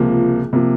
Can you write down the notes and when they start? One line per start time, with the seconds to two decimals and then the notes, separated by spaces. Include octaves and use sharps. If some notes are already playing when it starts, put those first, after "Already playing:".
Already playing: C#2 C3 F3 A#3
0.53 C3 F3 A#3